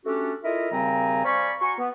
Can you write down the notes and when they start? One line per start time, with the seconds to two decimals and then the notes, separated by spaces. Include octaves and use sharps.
0.06 A3 C#4 D4 F#4 G4 A4
0.43 E4 F4 A4 A#4 D#5 E5
0.72 D#2 C#3 G3 C4 G#5 A#5
1.25 C5 D5 F5 G#5 B5 C#6
1.61 F#4 G#5 A#5 C6 C#6
1.78 B3